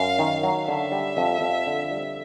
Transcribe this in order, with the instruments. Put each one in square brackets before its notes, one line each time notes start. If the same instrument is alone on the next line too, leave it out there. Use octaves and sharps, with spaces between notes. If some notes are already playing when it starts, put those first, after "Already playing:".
Already playing: [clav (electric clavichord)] F#2 [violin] F5
[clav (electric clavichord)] D#3
F#3
[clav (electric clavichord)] D3 [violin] E5
[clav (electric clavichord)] G3
F2
F2
D3
G3